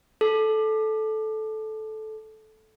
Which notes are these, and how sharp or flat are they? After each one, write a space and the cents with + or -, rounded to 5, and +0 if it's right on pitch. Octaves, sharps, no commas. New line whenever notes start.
A4 -15